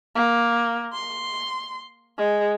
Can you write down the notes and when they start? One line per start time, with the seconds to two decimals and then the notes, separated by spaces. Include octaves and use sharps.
0.15 A#3
0.93 C6
2.18 G#3